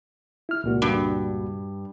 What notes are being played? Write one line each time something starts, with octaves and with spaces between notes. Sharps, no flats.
E4 F6
C#2 A#2 F#4
G2